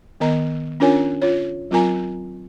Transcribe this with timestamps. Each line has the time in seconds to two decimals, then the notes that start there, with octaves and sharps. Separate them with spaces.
0.20 D#3 B3 A#4 D#5 A#5
0.80 C#4 D4 F4 A#4 C#5 G#5
1.22 F4 C#5
1.71 F#3 C4 F4 A#4 G#5 A#5